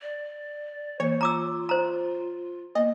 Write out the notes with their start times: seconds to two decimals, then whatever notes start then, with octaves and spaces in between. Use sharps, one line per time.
0.02 D5
1.00 E3 A#3 C5 C#5
1.21 F4 A#5 D6 E6
1.69 C5 A#5
2.75 A#3 B3 D#5